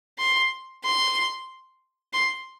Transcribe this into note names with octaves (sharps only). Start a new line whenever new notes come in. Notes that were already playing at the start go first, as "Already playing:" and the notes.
C6
C6
C6